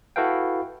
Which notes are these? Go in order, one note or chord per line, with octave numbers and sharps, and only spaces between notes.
E4 F#4 A4 B4 F5 G5